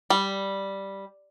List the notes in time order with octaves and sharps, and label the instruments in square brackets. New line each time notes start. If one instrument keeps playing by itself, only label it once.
[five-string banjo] G3